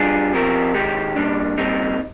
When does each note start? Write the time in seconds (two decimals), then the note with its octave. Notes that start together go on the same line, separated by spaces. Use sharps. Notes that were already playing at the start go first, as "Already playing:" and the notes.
Already playing: G3 D4 F4 G#4
0.33 F3 C4 G4 A#4
0.74 D#3 G#3 D#4 G4
1.16 A#2 G3 D4
1.57 A#2 G3 C4 D#4